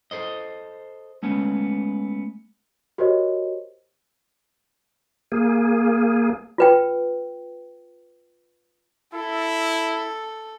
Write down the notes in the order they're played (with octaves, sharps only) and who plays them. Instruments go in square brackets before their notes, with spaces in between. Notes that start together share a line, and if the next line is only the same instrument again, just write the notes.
[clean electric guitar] A4 C5 D#5
G#3 A3 B3 C#4
[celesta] F#4 G4 A#4 C5 C#5 D#5
[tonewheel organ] A#3 G#4
[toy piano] F4 B4 G5
[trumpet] E4 [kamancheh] A4